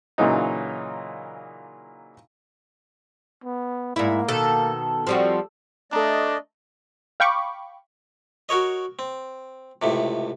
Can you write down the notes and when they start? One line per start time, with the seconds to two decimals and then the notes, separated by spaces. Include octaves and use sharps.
0.18 A#2 C#3 E3 F#3 D#4
3.44 B3
3.96 G#2 A#3 E4
4.28 B2 D#3 A4
5.07 F3 G3 C4 F#4
5.92 A3 D4 A4 D5 D#5 A#5
7.20 F5 G5 B5 C#6 D6
8.49 F#4 A#4 C#5 D#5
8.99 C4
9.82 C#2 A2 C3